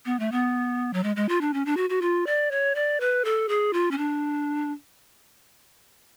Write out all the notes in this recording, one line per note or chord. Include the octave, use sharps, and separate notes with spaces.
B3
A3
B3
F#3
G#3
G#3
F4
D4
C#4
D4
F#4
F#4
F4
D5
C#5
D5
B4
A4
G#4
F4
C#4
D4